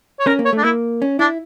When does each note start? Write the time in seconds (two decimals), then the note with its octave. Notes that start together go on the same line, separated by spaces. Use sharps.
0.20 C#5
0.27 C#4 A#4
0.39 A#3
0.45 C#5
0.53 A3
0.58 D4
0.64 A#3 E4
1.02 C#4
1.19 D4 E4